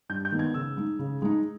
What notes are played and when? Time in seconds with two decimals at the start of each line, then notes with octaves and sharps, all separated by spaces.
0.09 G2 G6
0.25 G6
0.31 D#3 G#3 B3
0.39 G#6
0.54 C#3 E6
0.77 G#3 D#4
0.99 C#3
1.22 G#3 D#4